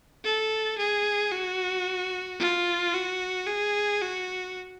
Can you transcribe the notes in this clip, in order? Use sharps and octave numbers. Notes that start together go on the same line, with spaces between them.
A4
G#4
F#4
F4
F#4
G#4
F#4